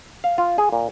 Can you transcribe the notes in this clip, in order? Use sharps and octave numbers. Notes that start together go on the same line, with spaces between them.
F5
F4
G#4
A#2